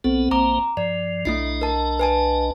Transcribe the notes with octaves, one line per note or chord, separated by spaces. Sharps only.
B1 B3 C4 A4
A#1 A#3 C5 A#5 D6
G2 F3 D5
B1 A3 D4 E4 D#5 C7
A#4 A5
B4 G#5 A5